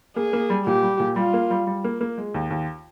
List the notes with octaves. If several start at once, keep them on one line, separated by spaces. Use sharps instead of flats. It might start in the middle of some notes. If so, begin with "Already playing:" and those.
A#3 G#4
A#3
G3
A#2 G4
G3
A#2
G3 F4
A#3
G3
G3
A#3
A#3
G#3
D#2
D#2